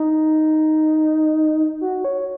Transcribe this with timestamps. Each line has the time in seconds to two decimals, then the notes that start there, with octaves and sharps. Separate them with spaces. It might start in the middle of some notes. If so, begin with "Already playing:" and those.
Already playing: D#4
1.81 F#4
2.05 C#5